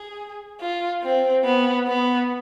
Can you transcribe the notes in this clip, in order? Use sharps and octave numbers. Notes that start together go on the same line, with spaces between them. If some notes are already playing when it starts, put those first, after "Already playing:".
Already playing: G#4
F4
C4
B3
B3